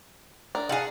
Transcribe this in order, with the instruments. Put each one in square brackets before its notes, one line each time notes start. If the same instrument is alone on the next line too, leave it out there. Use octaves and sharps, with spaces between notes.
[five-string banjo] D4 A#4
[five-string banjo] D#4 F5 A5 [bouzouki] G#4 F#5